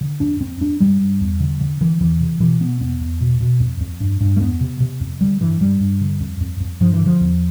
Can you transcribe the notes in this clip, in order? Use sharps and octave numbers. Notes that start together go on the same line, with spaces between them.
D3
F2 D4
F2 C4
F2 D4
G2 G3
G2
E2
D3
D3
D3 E3
E2 E3
C3
B2 E3
B2 B3
E2 B3
E2
B2
B2
F2
F2
G2
G2
A3
E2 B3
C3
C3
F2
D3 G3
G2 E3
G2 G3
G2
D3
F2
F2
F2
G2 F3
E3
D3
F3
E2